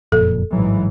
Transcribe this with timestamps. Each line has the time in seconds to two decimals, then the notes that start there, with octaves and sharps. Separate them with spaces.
0.12 F#1 F2 A#2 A4
0.53 A1 G#2 E3 F#3